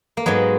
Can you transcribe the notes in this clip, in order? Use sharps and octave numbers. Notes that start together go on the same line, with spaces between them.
A#3
G#2 F#3 G#3 B3